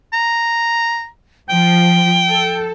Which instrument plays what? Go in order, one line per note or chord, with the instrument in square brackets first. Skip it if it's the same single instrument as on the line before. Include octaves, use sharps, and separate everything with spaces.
[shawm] A#5
[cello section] F3 [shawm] G5
[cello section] A4